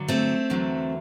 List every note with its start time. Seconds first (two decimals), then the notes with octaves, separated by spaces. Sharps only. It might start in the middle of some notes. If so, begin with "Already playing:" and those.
Already playing: G2 D3 F#3
0.08 A3 C4
0.50 E2 D3 F#3